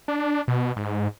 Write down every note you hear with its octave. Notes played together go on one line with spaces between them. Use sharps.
D4
B2
G#2